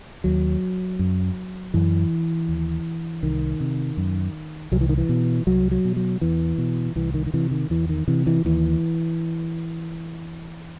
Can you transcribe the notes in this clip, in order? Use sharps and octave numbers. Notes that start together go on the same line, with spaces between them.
D#2 F#3
F#2
F#2 E3
D#2
C2 D#3
C3
F#2
C2 F#3
E3
D#3
E3
B2
C2 F#3
F#3
B2
F#3
E2 E3
B2
C2 E3
D#3
D#3
C3 E3
D#3
E2 E3
D#3
C3 E3
E3
D#2 E3